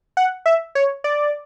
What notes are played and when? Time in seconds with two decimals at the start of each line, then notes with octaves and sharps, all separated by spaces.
0.17 F#5
0.46 E5
0.75 C#5
1.04 D5